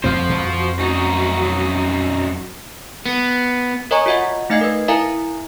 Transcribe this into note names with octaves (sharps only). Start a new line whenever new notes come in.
F2 F3 C4 F#4 C5 F5
F2
F#2 D#4
B3
A#4 C#5 D#5 G#5 A#5 C#6
F4 F#4 D#5 E5 F#5
A3 D#4 D#5 F5 G#6 C7
A#4 B4
E4 A#4 E5 F5 G#5 A#5